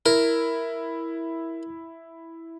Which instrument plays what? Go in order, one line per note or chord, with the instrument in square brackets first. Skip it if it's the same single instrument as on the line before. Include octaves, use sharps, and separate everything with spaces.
[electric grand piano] E4 [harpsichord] A#4